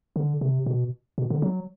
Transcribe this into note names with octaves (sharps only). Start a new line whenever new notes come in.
D3
C3
B2
B2
D3
F#3